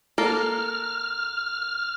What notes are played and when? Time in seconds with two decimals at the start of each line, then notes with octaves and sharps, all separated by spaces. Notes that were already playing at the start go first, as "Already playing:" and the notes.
0.18 A#3 A4 A#4 F6